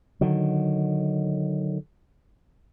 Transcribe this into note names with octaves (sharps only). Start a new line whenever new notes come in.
D3 D#3 F#3